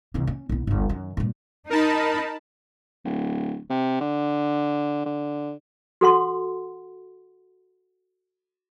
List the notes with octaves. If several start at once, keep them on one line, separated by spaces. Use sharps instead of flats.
C2 E3
C#4
B1 E4
G1 D2
F#2 D#3
G2 A#2
D#4 A#4 A5 B5
D1
C3
D3
D3
F#4 A4 F#5 C6